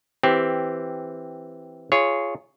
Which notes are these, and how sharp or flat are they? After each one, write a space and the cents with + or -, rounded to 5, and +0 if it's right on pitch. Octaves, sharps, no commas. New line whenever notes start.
E3 +0 C4 +0 G4 +0
F4 -20 G#4 +0 C#5 +0